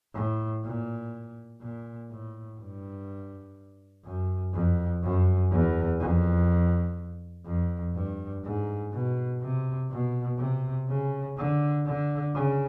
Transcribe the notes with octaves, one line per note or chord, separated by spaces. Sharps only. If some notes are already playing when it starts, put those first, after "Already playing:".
A2
A#2
A#2
A2
G2
F#2
F2
F#2
E2
F2
F2
G2
G#2
B2
C3
B2
C3
C#3
D3
D3
C#3